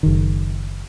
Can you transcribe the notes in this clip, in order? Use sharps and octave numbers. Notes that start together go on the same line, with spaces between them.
F#1 D#3